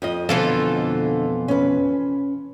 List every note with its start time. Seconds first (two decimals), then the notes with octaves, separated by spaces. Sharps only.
0.02 F2 F4 D#5
0.29 F2 B2 D3 E3 F4 A4 C5
1.48 C#4 B4